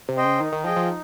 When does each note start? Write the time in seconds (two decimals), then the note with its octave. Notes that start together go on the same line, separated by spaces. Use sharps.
0.09 C3
0.17 C5 D#5 G5
0.25 C#3
0.40 D#3 D#4
0.52 D#3
0.64 F3 G#4 D#5 G5
0.76 F3
0.88 D#4